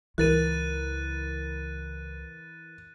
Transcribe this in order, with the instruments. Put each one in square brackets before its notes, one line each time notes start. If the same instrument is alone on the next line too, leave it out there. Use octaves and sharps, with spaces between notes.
[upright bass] C#2 [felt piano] E3 A#4 [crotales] F#6 A6 D#7